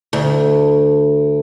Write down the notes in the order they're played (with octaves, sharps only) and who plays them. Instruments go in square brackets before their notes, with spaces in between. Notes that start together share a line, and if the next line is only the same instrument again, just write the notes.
[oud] D2